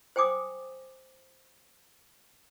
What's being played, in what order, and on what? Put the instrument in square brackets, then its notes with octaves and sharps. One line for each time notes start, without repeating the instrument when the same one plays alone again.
[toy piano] C5 G5 G#5 D6 D#6